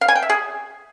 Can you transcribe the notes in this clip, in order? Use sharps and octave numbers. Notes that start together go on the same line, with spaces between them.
F5
G#5
G5
E5
G#4